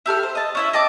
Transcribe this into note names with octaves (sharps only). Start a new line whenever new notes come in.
E4 G4 A4 F6
C5
D#5 A5
C#4 E4 E5
D#5 G5 A5 D6